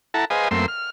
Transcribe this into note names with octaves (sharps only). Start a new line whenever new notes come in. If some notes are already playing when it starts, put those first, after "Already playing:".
E4 A4 F#5 A5 A#5
G#4 B4 C5 D#5 F5 G#5
F#2 A3 A#3 C4 C6 E6
F6